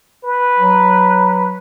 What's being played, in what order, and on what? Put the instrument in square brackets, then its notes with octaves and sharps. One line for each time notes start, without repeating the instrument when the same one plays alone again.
[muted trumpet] B4
[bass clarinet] F#3